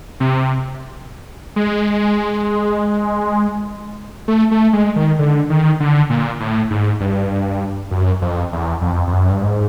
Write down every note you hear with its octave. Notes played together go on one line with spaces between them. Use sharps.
C3
G#3
A3
A3
G#3
D#3
D3
D#3
D3
A#2
A2
G#2
G2
F#2
F2
E2
F2
F2
F#2
G2
G#2